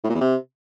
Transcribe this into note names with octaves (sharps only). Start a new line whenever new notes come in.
A2
A#2
E2
C3